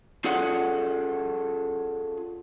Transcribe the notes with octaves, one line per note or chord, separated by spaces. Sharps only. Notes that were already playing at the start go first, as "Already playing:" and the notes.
C#4 F4 G#4 A4 D5 F#5